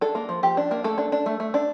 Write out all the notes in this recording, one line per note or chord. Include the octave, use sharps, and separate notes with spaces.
D4 A4
A#3
F3
F3 G4
D4
A#3
A3 A4
D4
D4
A3
A3
D4